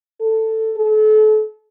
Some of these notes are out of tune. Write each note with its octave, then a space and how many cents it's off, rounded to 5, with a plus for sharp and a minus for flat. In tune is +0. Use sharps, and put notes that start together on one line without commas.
A4 +10
A4 -35